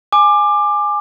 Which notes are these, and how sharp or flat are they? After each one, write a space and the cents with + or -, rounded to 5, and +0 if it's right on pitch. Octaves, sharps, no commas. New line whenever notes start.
G#5 +0 D6 +20